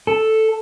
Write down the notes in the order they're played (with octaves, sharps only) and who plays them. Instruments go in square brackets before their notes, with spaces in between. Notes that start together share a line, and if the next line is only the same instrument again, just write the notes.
[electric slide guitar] A4